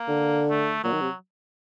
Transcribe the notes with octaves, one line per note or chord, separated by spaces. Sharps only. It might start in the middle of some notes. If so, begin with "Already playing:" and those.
Already playing: A#3
D3
A3
A#2 F#3
D#3
C3